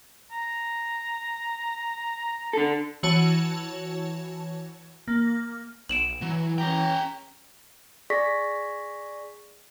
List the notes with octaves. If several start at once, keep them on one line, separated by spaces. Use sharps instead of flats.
A#5
D3 A4
E3 F#4 C#5 A5
A#3
B1 D7 E7 F#7
E3 F#3
C#4 G#4 G5 A#5
G#4 D5 C#6 A#6 B6